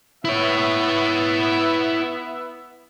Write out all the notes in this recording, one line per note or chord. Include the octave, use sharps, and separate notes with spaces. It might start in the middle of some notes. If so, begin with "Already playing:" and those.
B3 E4 C#5 E5